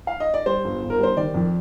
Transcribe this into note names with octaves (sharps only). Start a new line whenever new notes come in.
F5
D#5
D5
G3 C5
G1
G1
A#4
G3 C5
D#3 D5
F2